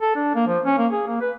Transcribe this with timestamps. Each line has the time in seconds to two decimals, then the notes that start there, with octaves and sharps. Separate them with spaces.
0.01 A4
0.15 D4
0.35 A#3
0.47 F3
0.65 C#4
0.78 A#3
0.92 G#4
1.07 A#3
1.21 B4